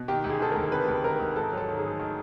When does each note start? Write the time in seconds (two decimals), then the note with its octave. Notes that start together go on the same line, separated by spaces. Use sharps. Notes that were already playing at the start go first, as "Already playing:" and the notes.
Already playing: B2
0.08 D#3 G4
0.24 D2
0.30 G#4
0.40 D#3 A4
0.51 D2 A#4
0.72 C3 B4
0.88 D2
1.04 D#3 A#4
1.20 D2
1.36 G#2 A4
1.52 F#3
1.57 A4
1.68 D#3
1.78 G#4
1.84 G#2
1.99 D#3